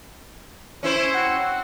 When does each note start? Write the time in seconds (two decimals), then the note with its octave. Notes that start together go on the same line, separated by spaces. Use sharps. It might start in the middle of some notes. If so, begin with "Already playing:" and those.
0.83 C#4 E4 C5
1.14 C4 F#4 F#5